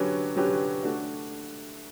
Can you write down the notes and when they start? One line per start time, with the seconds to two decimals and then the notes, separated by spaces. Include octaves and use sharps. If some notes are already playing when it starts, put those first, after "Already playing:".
Already playing: D3 F#3 C#4 G4 B4
0.36 D3 F#3 C#4 G4 B4
0.83 A3 D4 F#4